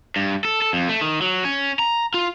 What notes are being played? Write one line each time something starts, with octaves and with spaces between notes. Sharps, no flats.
G2
A4
A4
F2
A3
D#3
F#3
C#4
A#5
F4